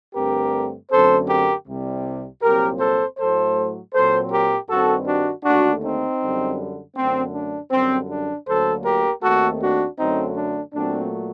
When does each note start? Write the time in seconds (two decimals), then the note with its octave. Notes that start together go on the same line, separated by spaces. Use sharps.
0.15 G2 D3 A3 C4 G4 A#4
0.91 F#2 D3 A3 C4 A4 C5
1.29 G4 A#4
1.67 C2 C3 G3
2.42 C2 A#2 F#3 C4 G4 A#4
2.80 A4 C5
3.18 A2 F#3 A3 A4 C5
3.93 A#2 F#3 C4 A4 C5
4.31 G4 A#4
4.69 G2 D#3 G3 C4 F#4 A4
5.07 D4 F#4
5.44 D#2 D3 A3 D4 F#4
5.83 C4 D#4
6.20 F#2 D3 G3
6.96 F#2 D3 A3 C4
7.34 D4
7.71 F#2 D3 G3 C4
8.10 D4
8.48 D2 D3 F#3 A#3 A4 C5
8.85 G4 A#4
9.23 D#2 D#3 A3 C4 F#4 A4
9.62 D4 F#4
9.98 F#2 D3 F#3 A3 C4 D#4
10.36 D4
10.74 A#2 F#3 A3 C4 D4